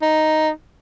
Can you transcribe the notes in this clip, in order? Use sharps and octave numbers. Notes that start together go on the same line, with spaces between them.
D#4